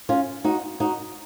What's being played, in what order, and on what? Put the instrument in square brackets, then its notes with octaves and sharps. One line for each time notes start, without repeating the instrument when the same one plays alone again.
[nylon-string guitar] C#4 F4
D#4 F#4
D#4 F#4